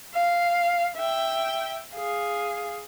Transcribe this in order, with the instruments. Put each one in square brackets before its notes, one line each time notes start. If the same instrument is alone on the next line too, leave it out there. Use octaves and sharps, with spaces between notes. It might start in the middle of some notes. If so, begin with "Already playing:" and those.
[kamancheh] F5
E5 G5
G#4 F5